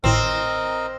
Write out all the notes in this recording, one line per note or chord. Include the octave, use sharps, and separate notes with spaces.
G#1 A2 C4 A#4 D#5